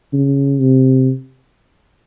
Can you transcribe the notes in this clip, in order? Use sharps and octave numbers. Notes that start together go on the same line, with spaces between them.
C#3
C3